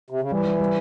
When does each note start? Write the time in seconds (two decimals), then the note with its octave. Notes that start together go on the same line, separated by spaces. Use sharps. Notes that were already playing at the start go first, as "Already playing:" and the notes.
0.10 C3
0.21 C#3
0.31 E3 G3
0.45 G3
0.59 G3